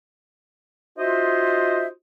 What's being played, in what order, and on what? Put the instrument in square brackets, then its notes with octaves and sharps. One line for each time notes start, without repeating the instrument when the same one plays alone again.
[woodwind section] D#4 F4 F#4 C5 D#5 E5